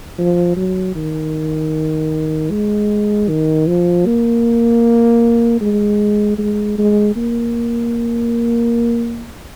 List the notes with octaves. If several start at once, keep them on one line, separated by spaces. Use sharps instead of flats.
F3
F#3
D#3
G#3
D#3
F3
A#3
G#3
G#3
G#3
A#3